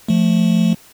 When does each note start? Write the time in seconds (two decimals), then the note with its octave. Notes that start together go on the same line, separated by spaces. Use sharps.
0.08 F3 A3